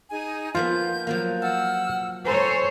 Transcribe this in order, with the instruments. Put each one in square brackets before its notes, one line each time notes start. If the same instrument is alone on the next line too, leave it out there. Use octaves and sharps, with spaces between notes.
[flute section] D#4 G#4 G#5
[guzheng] F3 A#3 B3 [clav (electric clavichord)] F4 [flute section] G6
[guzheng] F3 F#3 A#3
[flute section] F#5 E6 F6 [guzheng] A5
[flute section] A4 G#5 A#5 [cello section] C5 C#5